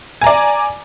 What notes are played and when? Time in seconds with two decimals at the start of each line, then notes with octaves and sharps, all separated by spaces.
0.22 G#5
0.24 A#5
0.27 D5